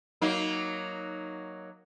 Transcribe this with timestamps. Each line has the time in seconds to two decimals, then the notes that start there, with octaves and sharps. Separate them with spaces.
0.22 F#3 A#3 D#4